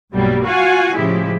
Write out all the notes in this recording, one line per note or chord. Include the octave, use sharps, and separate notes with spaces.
B1 G2 B2 F#3 G3 A#3
F4 F#4 F5 F#5 G#5 C#6
A2 C#3 F3 G#3 E4 G4